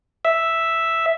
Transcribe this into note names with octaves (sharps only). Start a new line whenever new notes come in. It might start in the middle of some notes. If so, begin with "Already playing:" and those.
E5